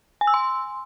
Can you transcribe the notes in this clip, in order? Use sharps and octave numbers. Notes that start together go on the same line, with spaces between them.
G#5
E6
C6